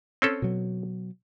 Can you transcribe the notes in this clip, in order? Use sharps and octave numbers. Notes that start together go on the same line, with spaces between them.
C4 C#4 A4
B2 F#3